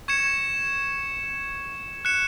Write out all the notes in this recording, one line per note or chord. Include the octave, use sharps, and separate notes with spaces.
C#6 G#6 C#7 E7
F#6 C#7 E7